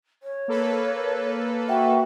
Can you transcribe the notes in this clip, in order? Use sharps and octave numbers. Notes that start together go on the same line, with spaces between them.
C#5
A#3 A4 B4
F#4 E5 F#5 G5